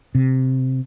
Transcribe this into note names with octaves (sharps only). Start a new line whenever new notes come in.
C3